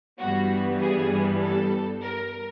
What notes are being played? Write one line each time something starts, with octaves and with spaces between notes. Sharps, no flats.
G2 E3 G3 B3 F#4
G#4
A4
A#4